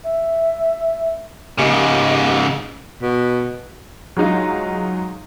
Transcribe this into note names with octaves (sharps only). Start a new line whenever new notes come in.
E5
G#2 C#3 A#3 G4 D#5
B2
F#3 G#3 D#4 F4